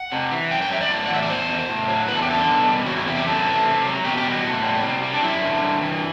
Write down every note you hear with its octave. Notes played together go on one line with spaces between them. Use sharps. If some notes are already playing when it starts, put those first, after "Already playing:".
Already playing: F#5
C3
E3
F#2 G5
G5
F#3 E5
D5
A2
F#5
E3 E5
D5
E2 C5
B2
A2
F#3
E2 B4
A4
G4
D3 A4
B2
G3
E2 F#4
E4
C3 E4
G4
F#2 A4
E3
C3
F#3
B2 G4
G4
G3
F#4
A2
G3
C3
G3
D4
F#2 E4
D3
G2
E3